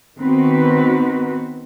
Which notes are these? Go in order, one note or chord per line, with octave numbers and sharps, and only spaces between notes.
D#3 B3 C4 F#4 B4